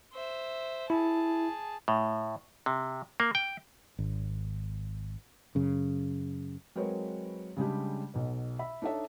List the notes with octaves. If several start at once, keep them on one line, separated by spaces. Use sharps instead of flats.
C5 E5
E4 G#4 A5
A2
C3
A#3
G5
G#1
F#2 C#3
F#3 G#3 C4 A#4 B4 C#5
C#3 G3 G#3 D4 G4
B1 B2
E5 B5
D4 D#4 A4 C#5 E5